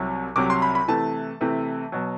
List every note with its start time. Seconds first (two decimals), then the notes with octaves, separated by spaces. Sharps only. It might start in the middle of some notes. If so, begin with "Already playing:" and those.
Already playing: C2 C3 F#3
0.36 C2 C3 F#3 D6
0.50 C6
0.62 B5
0.75 B5
0.88 C3 E3 A3 A5
1.41 C3 E3 A3
1.92 B2 F#3